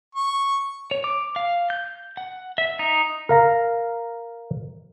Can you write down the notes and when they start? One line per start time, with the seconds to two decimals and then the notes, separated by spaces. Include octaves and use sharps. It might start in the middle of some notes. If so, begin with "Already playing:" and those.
0.15 C#6
0.91 C#5
1.04 D6
1.36 F5
1.70 G6
2.17 F#5
2.58 E5
2.79 D#4
3.29 A#4 F5 A#5